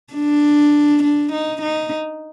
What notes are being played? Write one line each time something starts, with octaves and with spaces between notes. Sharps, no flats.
D4
D4
D#4
D#4